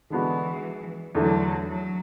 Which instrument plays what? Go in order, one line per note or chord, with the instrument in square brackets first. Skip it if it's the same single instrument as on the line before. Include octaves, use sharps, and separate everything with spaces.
[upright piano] D3 G#3 B3 D4 F#4 [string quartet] E3
[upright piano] E2 D3 A3 [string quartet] F#3
[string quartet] F#3